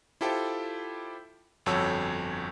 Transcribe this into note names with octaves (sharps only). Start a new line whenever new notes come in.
E4 F4 G4 A4 C5 G5
G1 F2 F#4 A4 C#5 E6